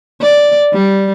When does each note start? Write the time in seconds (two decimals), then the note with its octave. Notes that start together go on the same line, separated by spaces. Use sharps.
0.21 D5
0.73 G3